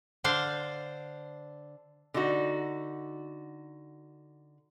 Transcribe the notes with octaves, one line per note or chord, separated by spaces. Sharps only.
D3 D4 C5 F5
D3 D#4 F#4